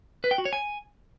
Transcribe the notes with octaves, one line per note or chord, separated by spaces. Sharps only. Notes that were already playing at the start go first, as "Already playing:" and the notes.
B4
G5
F#4
C#5
G#5